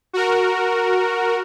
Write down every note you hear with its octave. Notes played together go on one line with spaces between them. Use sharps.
F#4 A#4